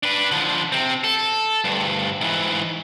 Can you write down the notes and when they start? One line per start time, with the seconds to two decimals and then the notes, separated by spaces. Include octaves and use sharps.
0.03 D4 B4
0.31 D3 F3
0.72 C3 C4
1.04 A4
1.64 D2 G2
2.21 G#2 E3